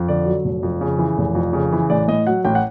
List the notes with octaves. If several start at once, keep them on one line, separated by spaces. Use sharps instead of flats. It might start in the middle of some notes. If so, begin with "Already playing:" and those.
Already playing: F2
D3 D5
F#3
F1
F2
C#3
E3
F1
F2
C#3
E3
A1 D5
A2 D#5
F#3 F#5
A1 G5
F#5